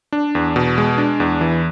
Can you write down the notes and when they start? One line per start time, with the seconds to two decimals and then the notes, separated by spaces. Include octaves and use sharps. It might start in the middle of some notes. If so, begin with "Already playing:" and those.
0.12 D4
0.35 E2
0.56 B2
0.78 G#3
0.98 D4
1.20 E2
1.41 E3